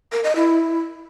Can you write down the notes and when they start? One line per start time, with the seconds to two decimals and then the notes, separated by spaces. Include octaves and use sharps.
0.12 A#4
0.24 D#5
0.36 E4